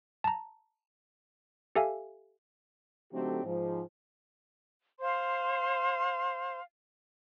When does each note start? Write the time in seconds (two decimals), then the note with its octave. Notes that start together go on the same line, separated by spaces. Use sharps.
0.24 A5 A#5
1.75 G4 A4 E5 F5 G#5
3.12 D3 F#3 A3 C4 D#4 G4
3.44 G#2 F3
5.00 C5 F5 C6